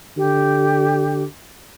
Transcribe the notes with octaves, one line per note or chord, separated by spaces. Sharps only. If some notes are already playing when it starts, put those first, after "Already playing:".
D3 G4